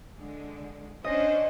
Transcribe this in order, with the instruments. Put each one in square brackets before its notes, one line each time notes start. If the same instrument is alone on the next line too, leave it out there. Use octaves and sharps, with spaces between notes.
[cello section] D3 G#3
[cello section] C#4 D4 C5 [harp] D#5